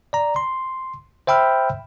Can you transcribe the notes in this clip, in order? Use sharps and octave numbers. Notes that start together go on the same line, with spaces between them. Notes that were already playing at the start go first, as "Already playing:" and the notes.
D5 A#5
C6
C5 E5 G5 B5 E6 F6